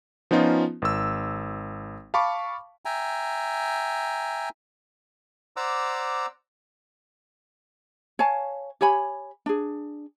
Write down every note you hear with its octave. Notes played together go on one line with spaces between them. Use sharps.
F3 B3 C#4 D#4 F4
G#1 E6
F5 A5 B5 C#6 D6
E5 G5 G#5 A#5
C5 D5 F#5 A#5 D6 E6
C#5 F5 G#5 A5
G4 C#5 G#5 B5
D4 G#4